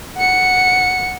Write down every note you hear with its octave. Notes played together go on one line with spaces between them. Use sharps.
F#5 C#7